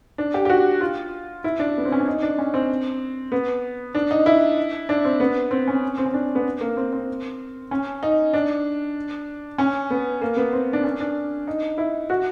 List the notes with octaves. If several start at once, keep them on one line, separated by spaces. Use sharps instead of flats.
D4
G4
G4
F#4
F4
E4
D4
B3
C4
C#4
D4
D#4
D4
C#4
C4
B3
D4
D#4
E4
D4
C4
B3
C4
C#4
C4
C#4
D4
B3
A#3
C4
C4
C#4
D#4
D4
C#4
B3
A#3
B3
C4
D4
C#4
D4
D#4
E4
F#4